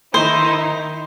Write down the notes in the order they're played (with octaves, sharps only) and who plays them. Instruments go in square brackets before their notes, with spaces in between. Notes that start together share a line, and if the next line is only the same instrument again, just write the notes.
[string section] D#3 D#4 E4 [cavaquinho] C5